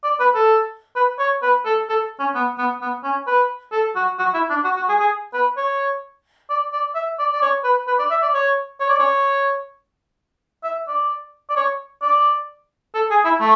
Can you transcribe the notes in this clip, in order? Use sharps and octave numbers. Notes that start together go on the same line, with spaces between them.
D5
B4
A4
B4
C#5
B4
A4
A4
C#4
B3
B3
B3
C#4
B4
A4
F#4
F#4
E4
D4
F#4
F#4
G#4
G#4
B4
C#5
D5
D5
E5
D5
D5
C#5
B4
B4
D5
E5
D5
C#5
C#5
D5
C#5
E5
D5
D5
C#5
D5
A4
G#4
E4
A3